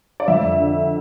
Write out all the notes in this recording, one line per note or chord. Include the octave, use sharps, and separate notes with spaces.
D5
F2 E5
D3